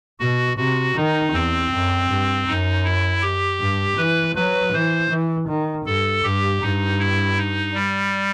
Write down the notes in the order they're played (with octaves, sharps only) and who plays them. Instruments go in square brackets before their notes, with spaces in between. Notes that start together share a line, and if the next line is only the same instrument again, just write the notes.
[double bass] B2 [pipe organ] F#4
[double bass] C3 [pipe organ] F#4
[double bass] D#3 [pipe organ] D#4
[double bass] E2 [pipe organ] C4
[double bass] F#2
G2
[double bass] F#2 [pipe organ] D#4
[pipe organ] E4
G4
[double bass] G2
[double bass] E3 [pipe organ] B4
[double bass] F#3 [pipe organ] B4
[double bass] E3 [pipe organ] C5
[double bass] E3
D#3
[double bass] G2 [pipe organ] A4
[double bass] G2 [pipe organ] G4
[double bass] G2 [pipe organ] D#4
[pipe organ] E4
D#4
G3